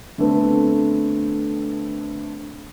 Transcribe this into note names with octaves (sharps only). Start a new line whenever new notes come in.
D3 A3 B3 C4